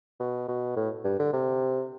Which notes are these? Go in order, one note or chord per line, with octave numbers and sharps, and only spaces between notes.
B2
B2
A2
G2
D3
C3